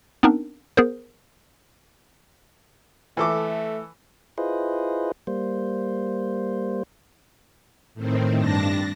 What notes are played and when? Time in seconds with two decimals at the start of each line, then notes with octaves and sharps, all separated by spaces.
0.23 B3 C4 D4 D#4 A#4
0.77 B3 G#4 A#4 C5
3.17 E3 A3 A4 D6
4.38 E4 F4 G#4 B4 C5 D#5
5.27 G3 A#3 C5
7.94 A2 D#3 C4
8.38 G2 D4 A5 A#6